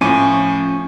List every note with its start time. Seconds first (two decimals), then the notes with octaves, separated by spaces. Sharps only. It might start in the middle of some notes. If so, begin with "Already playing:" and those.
0.01 A2 F3 C#4 G#5 D6